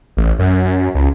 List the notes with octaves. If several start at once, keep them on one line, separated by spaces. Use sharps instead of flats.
A1
F#2
C#2